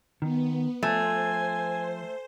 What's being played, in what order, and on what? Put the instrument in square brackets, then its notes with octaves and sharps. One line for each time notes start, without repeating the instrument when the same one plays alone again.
[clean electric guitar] D#3 [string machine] B3
[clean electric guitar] F3 [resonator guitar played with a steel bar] A3 [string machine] C5 [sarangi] G#5